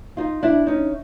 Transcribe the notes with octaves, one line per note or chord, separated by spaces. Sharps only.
D#4 F4
D4 E4
C#4 D#4